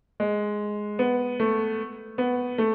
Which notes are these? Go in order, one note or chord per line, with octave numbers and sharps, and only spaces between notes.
G#3
B3
A3
B3
A3